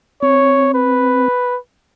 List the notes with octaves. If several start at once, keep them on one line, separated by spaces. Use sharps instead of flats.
C4 C#5
B4